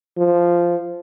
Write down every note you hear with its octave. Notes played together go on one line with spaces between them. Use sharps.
F3